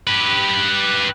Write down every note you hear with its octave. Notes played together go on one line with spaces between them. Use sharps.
G4 B4